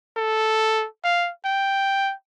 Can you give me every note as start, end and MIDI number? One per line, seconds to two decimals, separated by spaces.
0.17 0.86 69
1.04 1.31 77
1.45 2.13 79